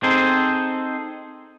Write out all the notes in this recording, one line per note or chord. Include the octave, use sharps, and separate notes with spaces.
C4 D#4 G#4 A4 C5